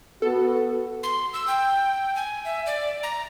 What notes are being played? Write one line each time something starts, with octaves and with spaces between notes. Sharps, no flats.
B3 F#4 A4
C6
E6
G5
G#5
E5
D5
A#5